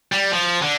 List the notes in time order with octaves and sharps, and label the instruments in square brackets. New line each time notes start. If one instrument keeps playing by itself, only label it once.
[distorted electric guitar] G3
F3
D3